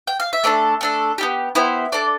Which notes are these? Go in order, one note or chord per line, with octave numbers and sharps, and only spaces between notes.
G5
F5
E5
A3 D4 A4 D5
A3 D4 A4
B3 E4 G4
B3 E4 G4 C5
D4 A4 D5